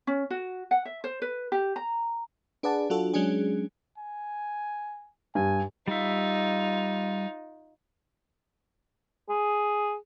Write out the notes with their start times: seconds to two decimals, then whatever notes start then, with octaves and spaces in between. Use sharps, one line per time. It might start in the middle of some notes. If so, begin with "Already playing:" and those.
0.07 C#4
0.30 F#4
0.71 F#5
0.85 E5
1.04 C5
1.22 B4
1.52 G4
1.76 A#5
2.63 D4 G#4 B4 D5 F#5 A5
2.90 F#3 D4 F4 F#4 A4
3.13 F#3 G#3 C#4 D4 G#4
3.98 G#5
5.35 G2 G#5
5.88 G3 D#4 F4 E5
9.29 G#4